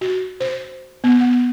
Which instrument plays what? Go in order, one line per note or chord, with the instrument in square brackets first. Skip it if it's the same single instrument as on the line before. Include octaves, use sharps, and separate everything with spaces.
[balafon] F#4
C5
B3
F#5